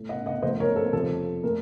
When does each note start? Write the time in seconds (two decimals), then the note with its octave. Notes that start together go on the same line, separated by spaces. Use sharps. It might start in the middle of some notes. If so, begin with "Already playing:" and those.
Already playing: A2 A3
0.09 D#5 F#5
0.26 D#5 F#5
0.42 A#2 F3 A3 C5 D#5
0.60 A#4 C#5
0.76 A4 C5
0.93 F2 C3 F3 A4
1.43 A#2 A3 A#4